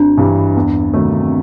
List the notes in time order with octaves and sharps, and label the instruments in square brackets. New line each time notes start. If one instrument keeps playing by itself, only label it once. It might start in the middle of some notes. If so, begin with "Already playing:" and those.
Already playing: [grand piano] G#1 [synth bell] D4
[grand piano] G2 E3 G3
E2
C3 D#3 F#3 A3